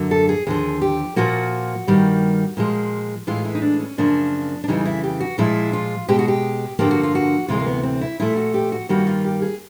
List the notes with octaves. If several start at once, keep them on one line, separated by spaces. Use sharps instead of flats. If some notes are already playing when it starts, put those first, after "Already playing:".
Already playing: F#2 D3 F#3 A#3
A4
G#4
D#2 D3 F3 G#4
G4
A#2 F3 A#3 F#4
G2 D#3 G3 A#3
A#2 F3 G#3
A2 E3 G#3 F4
E4
D#4
D4
C#4
F#2 C#3 F3 A#3 D4
D4
F2 C#3 E3 G3 D#4
E4
G4
F#4
A#2 F3 G#3 E4
F4
B2 G#3 G4
F#4
G4
G2 D3 F3 A#3 G4
F#4
F4
F#4
D2 C3 E3 G#3 F4
A#3
B3
C4
E4
A#2 F3 A3 E4
F#4
G4
F#4
G2 D#3 G3 A#3 F#4
F4
G4
G#4